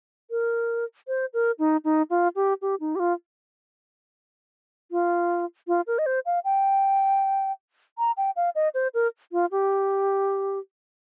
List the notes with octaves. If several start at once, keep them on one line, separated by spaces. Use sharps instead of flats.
A#4
C5
A#4
D#4
D#4
F4
G4
G4
D#4
G4
F4
F4
F4
A#4
D#5
C5
F5
G5
A#5
G5
F5
D#5
C5
A#4
F4
G4